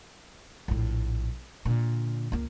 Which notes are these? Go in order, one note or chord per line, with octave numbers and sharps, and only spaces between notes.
A#1 A2
A#2 D3
C#2 A#3